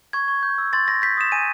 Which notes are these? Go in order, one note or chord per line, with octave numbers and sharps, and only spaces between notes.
C#6 G#6
C#6
G6
E6
C6 A6
C6 A#6
G6 B6
D#6 E7
G#5 D#7